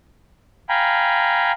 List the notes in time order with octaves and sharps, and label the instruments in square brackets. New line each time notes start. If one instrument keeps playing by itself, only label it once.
[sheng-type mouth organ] F5 G5 G#5 A#5 B5